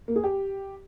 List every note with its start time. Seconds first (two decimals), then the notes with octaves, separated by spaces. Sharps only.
0.08 A#3
0.16 G#4
0.24 G4